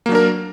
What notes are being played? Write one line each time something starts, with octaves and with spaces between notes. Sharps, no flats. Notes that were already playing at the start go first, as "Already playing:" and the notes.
F#3 A#3 D4 A#4